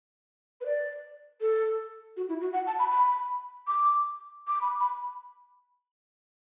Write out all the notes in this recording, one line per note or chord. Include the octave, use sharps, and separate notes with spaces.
B4
D5
A4
F#4
E4
F#4
F#5
A5
B5
B5
D6
D6
B5
B5